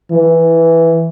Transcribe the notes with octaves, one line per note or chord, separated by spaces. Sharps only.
E3